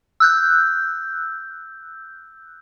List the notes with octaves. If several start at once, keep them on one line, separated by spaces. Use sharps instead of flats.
E6 F#6 G6